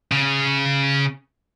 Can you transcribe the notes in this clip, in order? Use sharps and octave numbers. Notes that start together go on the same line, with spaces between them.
C#3